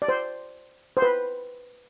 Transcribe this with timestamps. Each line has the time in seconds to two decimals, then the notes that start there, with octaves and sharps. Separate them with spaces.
0.02 D5
0.08 C5
0.97 C5
1.02 B4